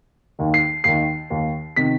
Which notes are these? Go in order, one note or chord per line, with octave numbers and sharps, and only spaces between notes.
D#2 D#3
C7
D#2 D#3 C7
D#2 D#3
C3 D#3 B6